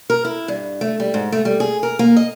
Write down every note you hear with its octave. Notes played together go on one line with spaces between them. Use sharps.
A#4
E4
G2
A3
G3
G#2
A3
G3
G#4
A#4
A#3
D#5